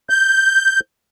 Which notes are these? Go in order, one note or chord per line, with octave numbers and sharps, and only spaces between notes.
G6